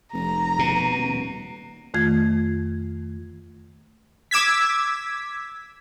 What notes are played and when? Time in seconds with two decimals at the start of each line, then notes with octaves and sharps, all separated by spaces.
0.13 F1 A#5
0.59 B2
0.96 D#1
1.94 F2 D#3 A3 F4 G#6
4.31 D6 E6 G#6 B6